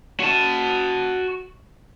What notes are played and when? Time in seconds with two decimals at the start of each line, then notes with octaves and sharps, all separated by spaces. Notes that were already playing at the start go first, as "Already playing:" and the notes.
0.20 F#4 A5